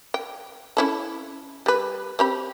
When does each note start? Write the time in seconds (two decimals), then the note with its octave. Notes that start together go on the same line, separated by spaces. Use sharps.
0.14 G5
0.77 C#4 E4 A4
1.66 G3 B4
2.19 C4 G4 B5